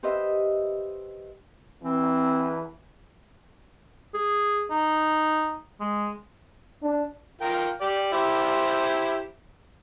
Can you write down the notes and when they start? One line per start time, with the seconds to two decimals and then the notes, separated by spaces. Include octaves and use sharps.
0.03 G4 B4 C5 D#5 E5
1.83 E3 C4
4.14 G#4
4.70 D#4
5.80 G#3
6.82 D4
7.41 F4 A#4 G5
7.81 G4 D5
8.13 E4 G4 C5